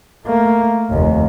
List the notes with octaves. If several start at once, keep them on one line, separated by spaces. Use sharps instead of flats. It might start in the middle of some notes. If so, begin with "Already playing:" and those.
A3 A#3
F1 D#2